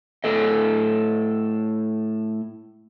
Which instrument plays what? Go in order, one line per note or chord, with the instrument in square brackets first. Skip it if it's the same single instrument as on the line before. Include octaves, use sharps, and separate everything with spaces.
[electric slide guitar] A2 A4 D#5